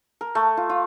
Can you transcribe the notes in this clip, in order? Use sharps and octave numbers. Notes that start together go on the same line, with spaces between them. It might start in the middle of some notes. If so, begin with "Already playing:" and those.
A#4
A3
F4
F4